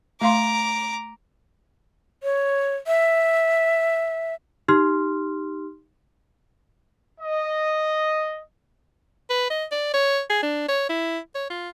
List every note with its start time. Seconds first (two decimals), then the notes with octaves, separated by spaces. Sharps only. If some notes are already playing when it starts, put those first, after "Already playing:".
0.21 A3 F5 A#5 C6 D6
2.23 C#5
2.87 E5
4.68 D#4 G4 C6 F6
7.21 D#5
9.30 B4
9.50 D#5
9.72 D5
9.94 C#5
10.30 G#4
10.43 D4
10.68 C#5
10.89 E4
11.35 C#5
11.50 F4